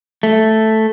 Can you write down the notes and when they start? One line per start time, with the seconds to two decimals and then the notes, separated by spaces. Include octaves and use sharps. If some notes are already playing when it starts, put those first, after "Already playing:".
0.23 A3